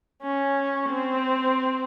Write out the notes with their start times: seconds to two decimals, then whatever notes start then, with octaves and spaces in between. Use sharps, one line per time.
0.22 C#4
0.89 C4